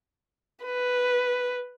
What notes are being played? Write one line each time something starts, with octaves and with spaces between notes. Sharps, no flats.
B4